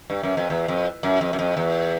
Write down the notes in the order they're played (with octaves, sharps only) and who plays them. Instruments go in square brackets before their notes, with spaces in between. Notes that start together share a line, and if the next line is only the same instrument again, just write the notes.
[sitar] G2
F#2
F2
E2
F2
F#2
F2
F#2
F2
E2